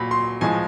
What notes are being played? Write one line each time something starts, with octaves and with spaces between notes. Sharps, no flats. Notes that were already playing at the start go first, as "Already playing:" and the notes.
Already playing: A#2 F#3 B5
C6
A2 F3 G#3 G#5